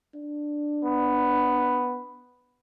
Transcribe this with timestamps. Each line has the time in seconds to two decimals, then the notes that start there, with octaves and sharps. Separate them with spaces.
0.15 D4
0.83 B3